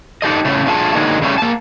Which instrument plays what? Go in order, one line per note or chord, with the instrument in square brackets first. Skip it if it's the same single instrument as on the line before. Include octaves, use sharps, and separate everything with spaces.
[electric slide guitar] D4 D#4 G4 A4 D#5
A2 C#3 A3
A3 D4 F4 G#4 G#5 A5
D3 F#3 G#3 A#3 D#4
C#3 G3 A3 A#3 C#4
A#3 A5